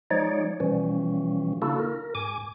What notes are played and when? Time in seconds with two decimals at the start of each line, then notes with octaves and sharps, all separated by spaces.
0.11 F3 G#3 D#4 C#5 D5
0.60 B2 E3 F3 G3 C#4
1.62 C#3 A#3 D4 E4 F#4 A4
1.79 A#4
2.15 G#2 G#5 D6